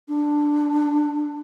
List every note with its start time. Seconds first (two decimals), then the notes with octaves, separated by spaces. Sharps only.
0.08 D4